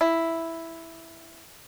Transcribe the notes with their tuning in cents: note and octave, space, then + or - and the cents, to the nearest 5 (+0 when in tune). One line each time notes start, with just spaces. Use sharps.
E4 +0